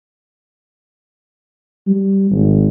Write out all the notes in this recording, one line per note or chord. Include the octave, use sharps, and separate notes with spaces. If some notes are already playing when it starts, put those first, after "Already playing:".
G3
G#1